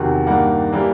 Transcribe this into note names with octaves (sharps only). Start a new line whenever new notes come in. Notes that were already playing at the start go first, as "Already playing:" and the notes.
Already playing: E2 C3 D#3 F#3
G2 D#3 G3 A#3 F#5
E3 G3 A#3